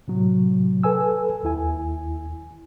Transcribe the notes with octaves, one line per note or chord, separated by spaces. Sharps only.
A2 C3 F#3
A4 B4 G#5 E6
D#2 E4 G#5